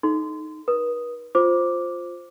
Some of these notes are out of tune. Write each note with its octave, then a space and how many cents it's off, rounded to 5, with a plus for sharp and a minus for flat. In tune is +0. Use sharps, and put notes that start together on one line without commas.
D#4 +0 A4 -25 C6 -25
B4 -40 D#6 -5
F4 +10 C5 +0 D6 +0